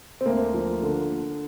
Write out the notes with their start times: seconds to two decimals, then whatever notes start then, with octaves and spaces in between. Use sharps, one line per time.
0.21 C4
0.26 D2 A#3
0.54 F3
0.83 D3